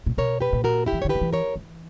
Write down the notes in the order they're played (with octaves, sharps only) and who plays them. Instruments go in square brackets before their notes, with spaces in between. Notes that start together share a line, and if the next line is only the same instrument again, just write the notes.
[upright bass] A#2
[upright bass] B2 [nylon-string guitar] A#4 C#5
[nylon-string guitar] G4 B4
[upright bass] A#2
[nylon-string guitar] F#4 A#4
E4 G4
[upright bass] E3
[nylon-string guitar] C#5
[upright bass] D3
[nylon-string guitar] G4 B4
[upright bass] D3
E3
[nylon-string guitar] A#4 C#5
[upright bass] E3